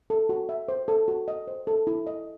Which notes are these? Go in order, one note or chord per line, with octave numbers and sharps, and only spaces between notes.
A4
F#4
E5
C5
A4
F#4
D#5
C5
A4
E4
D#5